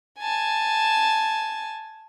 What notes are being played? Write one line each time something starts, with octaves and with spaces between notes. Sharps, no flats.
G#5 A5